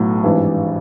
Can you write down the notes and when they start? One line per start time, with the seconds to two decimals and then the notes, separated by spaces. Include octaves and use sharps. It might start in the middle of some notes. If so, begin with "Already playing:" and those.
Already playing: B1 A2 F#3
0.23 G#1 G2 E3